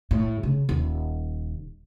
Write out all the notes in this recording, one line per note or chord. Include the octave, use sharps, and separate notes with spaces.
A2
C#3
D#1